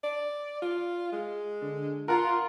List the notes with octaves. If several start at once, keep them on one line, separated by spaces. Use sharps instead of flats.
D5
F4
G#3
D3
F4 A#4 F#5 A#5